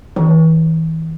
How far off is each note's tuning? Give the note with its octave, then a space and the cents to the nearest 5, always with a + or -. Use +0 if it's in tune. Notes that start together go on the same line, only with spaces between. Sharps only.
E3 -35